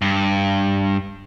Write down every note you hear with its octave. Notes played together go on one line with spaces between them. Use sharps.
G2